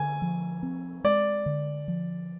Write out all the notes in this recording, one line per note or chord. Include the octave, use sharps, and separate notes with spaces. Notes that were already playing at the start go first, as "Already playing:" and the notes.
Already playing: D3 G#5
F3
C4
G#3 D5
D3
F3